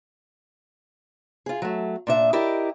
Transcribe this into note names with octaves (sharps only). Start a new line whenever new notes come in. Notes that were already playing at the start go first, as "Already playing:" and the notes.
F4 G#4
F#3 A3
A#2 D4 E5
E4 G4 A#4 D5 D#5